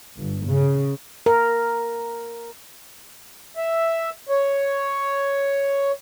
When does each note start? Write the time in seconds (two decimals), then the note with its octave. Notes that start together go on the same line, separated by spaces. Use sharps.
0.18 G1
0.47 C#3
1.26 A#4
3.57 E5
4.29 C#5